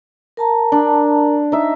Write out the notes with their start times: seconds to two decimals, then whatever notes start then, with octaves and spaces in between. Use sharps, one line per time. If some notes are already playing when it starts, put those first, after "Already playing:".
0.37 A#4 A5 A#5
0.72 D4
1.52 D#4 E5